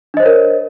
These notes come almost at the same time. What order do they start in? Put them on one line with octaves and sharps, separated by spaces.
D4 D#5 C5 C#5 A#4